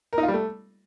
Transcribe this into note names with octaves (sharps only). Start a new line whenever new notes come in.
A#4
D#4
F4
G3
A3